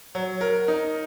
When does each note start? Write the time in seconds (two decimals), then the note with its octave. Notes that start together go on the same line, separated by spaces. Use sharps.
0.15 F#3
0.41 A#4
0.68 D#4